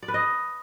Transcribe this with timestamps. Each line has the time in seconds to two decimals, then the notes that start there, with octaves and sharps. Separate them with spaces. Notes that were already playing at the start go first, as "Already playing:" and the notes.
0.02 D5
0.08 B4
0.14 D#5